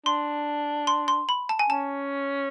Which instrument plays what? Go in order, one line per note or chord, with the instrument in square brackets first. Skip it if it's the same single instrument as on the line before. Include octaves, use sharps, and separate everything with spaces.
[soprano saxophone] D4 [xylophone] C6
[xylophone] C6
C6
B5
A5
G#5
[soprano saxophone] C#4 [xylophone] A5